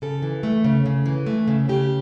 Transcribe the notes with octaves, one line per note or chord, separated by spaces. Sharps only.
C#3 A4
E3
A3
C#3
C#3
E3
A3
C#3
C#3 G4